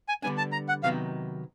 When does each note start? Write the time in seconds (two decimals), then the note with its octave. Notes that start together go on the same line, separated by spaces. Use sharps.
0.09 G#5
0.22 D3 G3 B3 D4 G#5
0.38 A5
0.52 A#5
0.69 F#5
0.83 C3 D#3 F#3 B3 D#4 F5